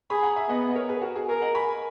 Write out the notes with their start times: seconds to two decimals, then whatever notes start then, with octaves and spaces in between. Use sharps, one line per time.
0.10 G#4 G#5 B5
0.23 F#5 A#5
0.36 E5 G#5
0.49 B3 D#5 F#5
0.71 D#5
0.75 A#4 C#5
0.89 G#4 B4
1.01 F#4 A#4
1.15 G#4
1.29 G#4 A#4
1.42 D#5 F#5
1.54 G#5 B5